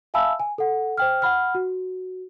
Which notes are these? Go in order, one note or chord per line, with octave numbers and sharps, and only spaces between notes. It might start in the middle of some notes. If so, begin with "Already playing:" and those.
E5 F5 G#5 A5 B5 E6
G#5
A4 F#5
C5 G5 F6
F#5 B5 F6
F#4